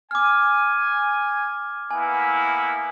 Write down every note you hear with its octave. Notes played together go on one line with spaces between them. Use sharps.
G#5 D6 F6
A#3 B3 E4 G#5